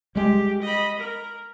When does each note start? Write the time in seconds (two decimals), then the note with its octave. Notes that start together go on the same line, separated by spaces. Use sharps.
0.15 G3 G#3 G4
0.62 D#5 B5
0.99 A#4